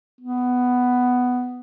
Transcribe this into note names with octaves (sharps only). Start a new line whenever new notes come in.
B3